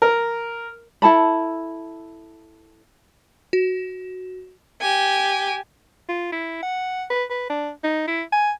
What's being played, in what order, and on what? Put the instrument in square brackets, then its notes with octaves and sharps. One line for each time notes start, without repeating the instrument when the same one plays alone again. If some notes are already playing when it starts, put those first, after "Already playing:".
[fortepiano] A#4
[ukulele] E4 A4 A5 B5
[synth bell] F#4
[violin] G4 G#5
[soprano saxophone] F4
E4
F#5
B4
B4
D4
D#4
E4
G#5